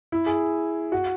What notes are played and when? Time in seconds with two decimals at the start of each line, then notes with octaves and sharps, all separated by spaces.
0.12 E4
0.26 G#4
0.92 F#4